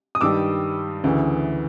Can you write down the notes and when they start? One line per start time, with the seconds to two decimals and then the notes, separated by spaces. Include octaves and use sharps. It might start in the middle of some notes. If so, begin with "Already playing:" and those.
0.15 D#6
0.21 G2 D#3 G3 D6 E6
1.04 D2 C#3 E3